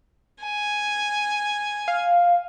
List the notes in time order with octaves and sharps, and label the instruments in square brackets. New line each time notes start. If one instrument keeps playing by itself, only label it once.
[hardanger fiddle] G#5
[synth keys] F5